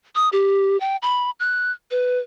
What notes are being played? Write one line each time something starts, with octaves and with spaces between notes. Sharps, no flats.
D#6
G4
G5
B5
F#6
B4